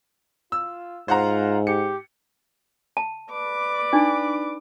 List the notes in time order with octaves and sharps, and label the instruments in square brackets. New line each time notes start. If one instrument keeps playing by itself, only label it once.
[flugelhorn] F4 [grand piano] E6
[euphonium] G#2 [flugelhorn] F4 [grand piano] C5 F#5 A#5
[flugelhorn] G4 [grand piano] C#7
[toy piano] A5
[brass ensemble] B4 D5 [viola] D6
[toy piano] D4 D#4